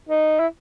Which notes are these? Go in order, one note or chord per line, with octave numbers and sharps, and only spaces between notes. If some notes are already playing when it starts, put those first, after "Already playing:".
D#4
E4